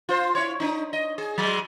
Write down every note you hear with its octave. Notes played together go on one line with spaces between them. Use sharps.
F4 C5
E4 C#5
D4 D#4
D#5
G#4
F#3 G#3